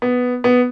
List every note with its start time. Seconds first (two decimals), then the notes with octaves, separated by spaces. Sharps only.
0.02 B3
0.44 B3